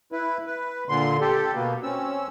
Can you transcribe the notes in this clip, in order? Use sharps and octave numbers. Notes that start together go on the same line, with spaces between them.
E4 B4
B4
A#2 D3 C6
G4 A4
B2 A#3 B3
C4 C#4 E6